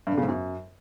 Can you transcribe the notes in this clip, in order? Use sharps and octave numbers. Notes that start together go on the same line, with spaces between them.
G2
D3
C#3
G#2
F#2